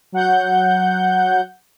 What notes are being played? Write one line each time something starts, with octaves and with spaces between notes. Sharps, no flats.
F#3 F#5 G6